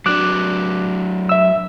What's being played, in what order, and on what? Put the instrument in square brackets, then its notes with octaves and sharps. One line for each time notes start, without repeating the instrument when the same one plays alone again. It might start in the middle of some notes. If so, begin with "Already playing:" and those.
[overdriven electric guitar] F#3 D4 [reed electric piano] D6 F#6
[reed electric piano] E5 E6